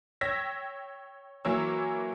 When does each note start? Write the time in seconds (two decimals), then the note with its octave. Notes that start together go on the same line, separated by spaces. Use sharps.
0.21 C#5 G5 E6 G#6 A#6 B6
1.45 E3 F#3 A#3 C#5 E6